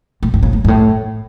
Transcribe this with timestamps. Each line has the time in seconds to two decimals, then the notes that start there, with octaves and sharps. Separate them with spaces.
0.23 A2
0.34 A2
0.43 C#3
0.53 A2
0.64 G#2
0.68 A2